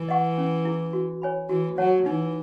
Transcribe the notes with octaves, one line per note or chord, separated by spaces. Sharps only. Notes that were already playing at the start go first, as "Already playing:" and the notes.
Already playing: E3
D#5 F#5 C#6
C#4
E4 G#4
F#4
C#5 G#5 B5
E3 F#4
F#3 C#5 F#5 A5
E3 D#4